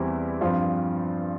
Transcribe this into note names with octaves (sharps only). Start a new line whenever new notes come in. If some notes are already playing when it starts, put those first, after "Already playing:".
Already playing: E2 E3 G3 C4 E4
G2 F3 C4 F4